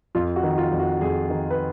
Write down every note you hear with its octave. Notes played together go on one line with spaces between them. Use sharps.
F2 F4
F#4
D#3
F4
F2
F#4
F2 G#4
D#3
B4